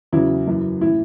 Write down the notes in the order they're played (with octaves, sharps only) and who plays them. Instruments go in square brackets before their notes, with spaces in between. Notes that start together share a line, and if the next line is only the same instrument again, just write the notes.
[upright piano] E2 C#3 F#3 E4
F#2 E3
A2 E3 E4